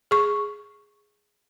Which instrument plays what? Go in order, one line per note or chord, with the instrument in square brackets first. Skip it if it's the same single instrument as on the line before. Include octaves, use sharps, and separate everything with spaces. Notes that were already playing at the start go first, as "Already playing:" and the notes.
[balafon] G#4 C#6